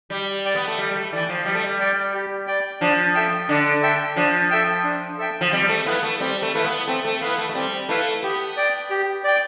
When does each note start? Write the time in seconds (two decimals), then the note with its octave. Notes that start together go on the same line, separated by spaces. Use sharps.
0.10 G3 G4
0.45 D5 G5
0.55 B3
0.67 A3
0.78 G3 G4
0.90 G3
0.96 A3
1.12 E3 D5 G5
1.29 F3
1.45 G3 G4
1.54 A3
1.63 G3
1.80 D5 G5
2.14 G4
2.47 D5 G5
2.81 F3 D4
3.15 A4 E5 G5
3.49 D3 D4
3.82 A4 E5 G5
4.16 F3 D4
4.51 A4 E5 G5
4.84 D4
5.18 A4 E5 G5
5.41 F3
5.52 G3 C4
5.69 A3
5.86 B3 E4 B4 F5
6.03 A3
6.20 G3 C4
6.42 A3
6.54 A3 E4 B4 F5
6.64 B3
6.87 A3 C4
7.05 A3
7.21 B3 E4 B4 F5
7.38 A3
7.49 A3
7.55 G3 C4
7.89 A3 E4 B4 F5
8.23 B3 G4
8.57 D5 G5
8.90 G4
9.24 D5 G5